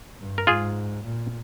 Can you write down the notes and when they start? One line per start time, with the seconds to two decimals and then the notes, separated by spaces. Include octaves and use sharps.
0.20 G2
0.38 A#4
0.47 G#2 F4 G#4
1.04 A#2